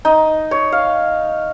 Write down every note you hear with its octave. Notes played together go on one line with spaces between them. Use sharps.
D#4
C#5
F5